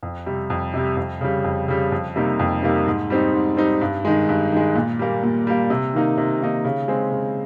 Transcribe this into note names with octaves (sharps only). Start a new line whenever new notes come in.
F2
C3 G3
F2
C3 G3
F2
C#3 G3
F2
C#3 G3
F2
C3 G3 A#3 D#4
F2
C3 G3 A#3 D#4
G#2
G3 C4 D#4
G#2
G3 C4 D#4
G2
D#3 G#3
G2
D#3 G#3
A#2
G3 A#3
A#2
G3 A#3
C3
D#3 A#3 D#4
C3
D#3 A#3 D#4
C#3
G#3 C4
C#3